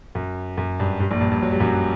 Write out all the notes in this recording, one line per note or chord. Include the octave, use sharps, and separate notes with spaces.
F#2
F#2
G2
G2
A#1 A#2
G2
G2
F#3
G3
F#2 F#3